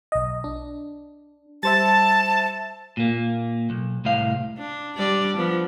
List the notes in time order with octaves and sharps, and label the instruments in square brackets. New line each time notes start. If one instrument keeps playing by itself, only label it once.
[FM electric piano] B1 D#5
D4
[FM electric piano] G3 C5 E5 [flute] A5 [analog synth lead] A6
[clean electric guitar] A#2 A#3
B1
C2 A2 C3 F5
[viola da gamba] D4
G3 D4 D5
F3 B3